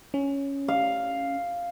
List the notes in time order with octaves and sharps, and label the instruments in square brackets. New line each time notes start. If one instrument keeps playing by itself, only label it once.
[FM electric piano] C#4
[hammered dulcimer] F5